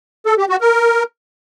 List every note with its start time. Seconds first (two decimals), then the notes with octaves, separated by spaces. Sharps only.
0.26 A4
0.38 G4
0.49 F#4
0.61 A#4